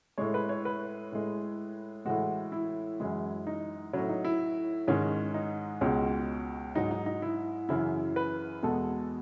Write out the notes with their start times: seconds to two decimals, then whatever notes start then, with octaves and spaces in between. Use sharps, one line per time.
0.18 A2 G#3 C#5
0.34 B4
0.49 C#5
0.65 B4
1.12 A2 G#3
2.05 A2 E3 G#3 F#4
2.52 E4
3.00 F#2 E3 G#3
3.47 D#4
3.93 A2 F#3 C#4
4.09 D#4
4.25 E4
4.88 G#2 D#3 G#3 C#4
5.34 D#4
5.81 C#2 B2 G#3 C#4
6.75 G#2 F#3 D#4
6.91 D#4
7.06 D#4
7.22 E4
7.69 F#2 C#3 E3 E4
8.16 B4
8.63 E2 B2 G#3 A4